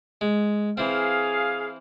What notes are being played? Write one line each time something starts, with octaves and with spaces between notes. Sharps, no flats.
G#3
E3 C4 G#4 F5